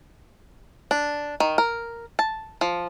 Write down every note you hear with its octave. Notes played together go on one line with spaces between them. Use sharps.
D4
D#3
A#4
A5
F3